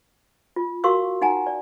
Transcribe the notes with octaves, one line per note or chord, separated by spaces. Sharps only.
F4
F#4 A#4 F5 C6 C#6 E6
D#4 F#5 G#5 A#5
D5